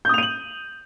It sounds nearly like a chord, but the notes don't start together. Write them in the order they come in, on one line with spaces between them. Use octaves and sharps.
G6 D#6 F7 D#7 F#7